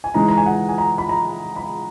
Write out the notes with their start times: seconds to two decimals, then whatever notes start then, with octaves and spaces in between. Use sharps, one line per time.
0.04 G#5
0.14 C#3 E3 G#3 D#4 A#5
0.29 A#5
0.37 G#5
0.46 F#5
0.69 G#5
0.78 A#5
0.98 B5
1.09 A#5
1.56 B5